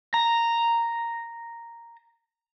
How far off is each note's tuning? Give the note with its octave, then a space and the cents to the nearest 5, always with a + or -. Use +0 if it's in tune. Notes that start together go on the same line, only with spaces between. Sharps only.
A#5 -5